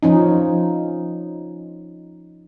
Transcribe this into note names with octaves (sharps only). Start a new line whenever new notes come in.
F3 C#4 D#4